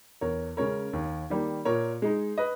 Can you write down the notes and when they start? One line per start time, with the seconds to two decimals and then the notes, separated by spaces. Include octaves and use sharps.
0.21 E2 A#4 C#5
0.57 C#3 G#3 C#4 A#4 C#5
0.93 D#2
1.30 D#3 G3 A#3
1.65 A#2 A#4 C#5
2.02 G#3 D#4
2.38 B4 D#5